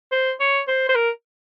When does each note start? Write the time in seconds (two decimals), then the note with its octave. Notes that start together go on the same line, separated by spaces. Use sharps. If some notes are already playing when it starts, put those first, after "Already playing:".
0.12 C5
0.40 C#5
0.68 C5
0.89 C5
0.95 A#4